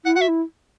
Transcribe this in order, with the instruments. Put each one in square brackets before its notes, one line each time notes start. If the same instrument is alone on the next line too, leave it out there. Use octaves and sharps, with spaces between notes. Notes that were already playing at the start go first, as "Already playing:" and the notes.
[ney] E4 [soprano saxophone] F#5
[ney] F#4 [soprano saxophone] F#5
[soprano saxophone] E5
[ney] E4